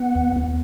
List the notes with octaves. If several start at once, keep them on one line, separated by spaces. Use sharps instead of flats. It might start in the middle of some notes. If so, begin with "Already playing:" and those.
Already playing: B3 F#5
D#2
D#2